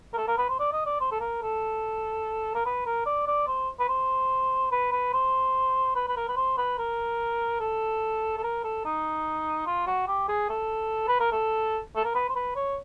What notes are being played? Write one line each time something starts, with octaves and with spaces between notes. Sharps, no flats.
A#4
A4
A#4
B4
C5
D5
D#5
D5
C5
A4
A#4
A4
A#4
B4
A#4
D5
D5
C5
B4
C5
B4
B4
C5
B4
B4
A#4
B4
C5
B4
A#4
A4
A4
A#4
A4
D#4
F4
F#4
G4
G#4
A4
B4
A#4
A4
A4
A#4
B4
C5
B4
C#5